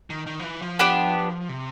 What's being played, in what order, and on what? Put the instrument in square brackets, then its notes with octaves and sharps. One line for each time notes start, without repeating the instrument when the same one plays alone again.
[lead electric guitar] D#3
D#3
F3
E3
F3
[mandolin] B3 D4 G4
[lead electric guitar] C3